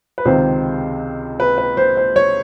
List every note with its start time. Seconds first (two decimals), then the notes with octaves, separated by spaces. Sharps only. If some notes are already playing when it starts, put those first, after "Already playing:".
0.18 B4
0.25 C#2 C3 D#3 C5
1.40 B4
1.58 B4
1.77 C5
1.97 C5
2.16 C#5